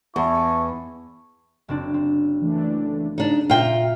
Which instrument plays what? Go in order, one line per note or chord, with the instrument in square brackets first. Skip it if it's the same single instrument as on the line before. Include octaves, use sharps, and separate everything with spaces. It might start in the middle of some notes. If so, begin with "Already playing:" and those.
[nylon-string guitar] E2 [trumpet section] E4 A5 C#6
[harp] F#1 C4 D4
C4
[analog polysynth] E3 A3 D4
[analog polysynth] C#3 [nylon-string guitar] D4 D#4
[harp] A#2 E5 A#5 [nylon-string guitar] F4 G5